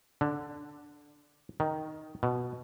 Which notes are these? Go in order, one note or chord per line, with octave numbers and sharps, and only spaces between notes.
D3
D#3
B2